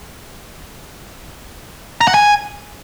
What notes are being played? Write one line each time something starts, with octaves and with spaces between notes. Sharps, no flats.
A#5
F#5
G#5